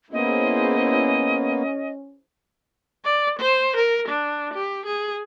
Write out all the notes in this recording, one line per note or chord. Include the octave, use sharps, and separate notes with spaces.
A#3 B3 C#4 E4 G#4 C5 D#5
D5
C5
A#4
D4
G4
G#4